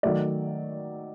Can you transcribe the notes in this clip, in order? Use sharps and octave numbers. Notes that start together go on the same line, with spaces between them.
D#3 F#3 A3 D5